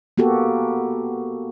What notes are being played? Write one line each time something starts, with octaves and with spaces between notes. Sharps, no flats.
A#3 B3 F#4 G4 A4